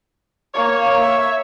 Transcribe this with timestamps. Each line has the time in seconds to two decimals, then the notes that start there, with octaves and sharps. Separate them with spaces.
0.55 A#3 C#5
1.02 E5